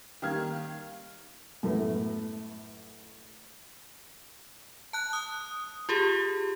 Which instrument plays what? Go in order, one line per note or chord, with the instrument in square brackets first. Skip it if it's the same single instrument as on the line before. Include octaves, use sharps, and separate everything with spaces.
[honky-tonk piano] D#3 G3 A#3 F5 F6 G#6
[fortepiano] F#2 A2 A3 B3
[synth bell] A5 F#6
D#6
F4 G4 G#4